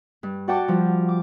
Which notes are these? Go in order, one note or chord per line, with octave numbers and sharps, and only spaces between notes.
G2
F#4 D5 F#5 G5 A5 D6
F3 G3
D6